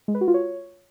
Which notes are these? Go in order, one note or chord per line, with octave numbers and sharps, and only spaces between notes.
G#3
B4
F#4
F4
C#5